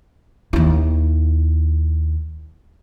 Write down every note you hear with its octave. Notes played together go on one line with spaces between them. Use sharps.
D#2 E4